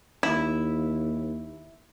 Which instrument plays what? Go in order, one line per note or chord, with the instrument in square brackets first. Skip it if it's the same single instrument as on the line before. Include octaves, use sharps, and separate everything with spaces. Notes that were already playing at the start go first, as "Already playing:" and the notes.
[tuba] D#2 [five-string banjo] E4